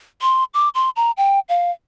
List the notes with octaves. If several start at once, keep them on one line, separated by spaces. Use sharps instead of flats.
C6
D6
C6
A#5
G5
F5